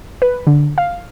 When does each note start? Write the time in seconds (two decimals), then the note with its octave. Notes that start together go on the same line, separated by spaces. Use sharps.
0.22 B4
0.47 D3
0.78 F5